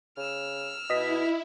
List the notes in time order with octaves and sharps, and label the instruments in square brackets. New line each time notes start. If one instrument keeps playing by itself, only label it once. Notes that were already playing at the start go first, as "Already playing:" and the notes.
[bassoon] C#3 [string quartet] E6 F6
[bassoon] B2 [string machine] E4 [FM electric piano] D#5 B6